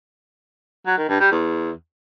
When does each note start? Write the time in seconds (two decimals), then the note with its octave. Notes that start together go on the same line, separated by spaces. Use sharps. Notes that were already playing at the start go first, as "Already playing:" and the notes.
0.87 F#3
0.98 D#3
1.09 G2
1.20 G3
1.31 E2